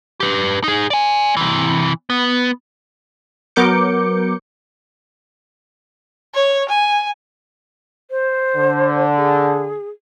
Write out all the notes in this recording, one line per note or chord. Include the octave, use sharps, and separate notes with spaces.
G4 B4
D#4 G#4
D5 G#5
C3 E3
B3
F#3 B3 A#4 D6 G6 C#7
C#5
G#5
C5
D3
G#4